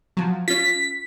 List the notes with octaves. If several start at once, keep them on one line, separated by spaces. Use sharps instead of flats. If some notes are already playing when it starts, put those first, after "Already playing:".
F3 F#3
C#4 F4 B6